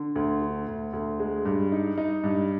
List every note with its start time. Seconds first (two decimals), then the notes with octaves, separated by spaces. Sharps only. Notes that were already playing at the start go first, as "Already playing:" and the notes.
Already playing: D3
0.16 D2
0.42 D3
0.68 D2
0.93 D2
1.20 G#3
1.46 G2
1.72 D#4
1.98 D#4
2.24 G2